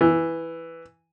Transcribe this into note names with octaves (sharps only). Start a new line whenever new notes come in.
E3